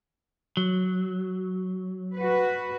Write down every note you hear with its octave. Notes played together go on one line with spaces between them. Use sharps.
F#3
F#4 B4